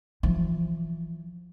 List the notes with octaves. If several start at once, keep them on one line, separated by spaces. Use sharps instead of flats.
E3 F3